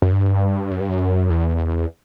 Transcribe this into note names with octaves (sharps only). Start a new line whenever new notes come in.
F#2
G2
F#2
G2
F#2
E2